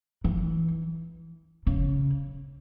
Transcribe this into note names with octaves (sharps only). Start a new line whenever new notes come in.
E3
C#3